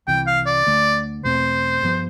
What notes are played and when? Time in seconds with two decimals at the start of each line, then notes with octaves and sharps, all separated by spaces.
0.07 C2 C3 E3 G5
0.27 F5
0.46 D5
0.66 D2 D3 A3
1.24 E2 B2 A3 C4 C5
1.83 G2 F3 B3